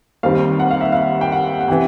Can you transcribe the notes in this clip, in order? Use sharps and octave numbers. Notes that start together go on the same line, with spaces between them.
D#2 D#3 G3 C4 F5
F#5
F5
E5
F5
G5
F#5
F#5
C3 E3 G5